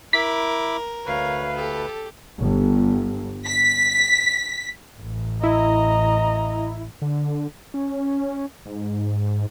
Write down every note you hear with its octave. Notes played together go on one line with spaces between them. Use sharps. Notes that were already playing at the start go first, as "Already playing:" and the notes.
E4 A#4 B5 D6 B6
D2 B4 C#5 F5
G4 A4
G1
B6
A1
E4 D#5 A#5
D3
C#4
G#2